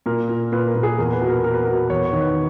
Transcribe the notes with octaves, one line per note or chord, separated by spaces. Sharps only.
A#2 A#4
A#2
A#2 B4
A#4
A#2
G#4
E2 A#4
B4
B2
A#4
B2 A#4
B4
B2 A#4
E2 C#5
C#5
D#3
B4